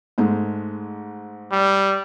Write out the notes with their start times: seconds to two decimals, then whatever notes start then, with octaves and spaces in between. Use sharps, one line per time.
0.18 G#2 G#3 A3
1.52 G3